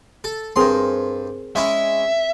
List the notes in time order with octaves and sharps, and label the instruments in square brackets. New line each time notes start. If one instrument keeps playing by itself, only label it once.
[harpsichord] A4
[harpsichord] G2 C6 [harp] C4 G#4 A#4
[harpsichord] G#3 C#4 E4 [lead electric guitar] E5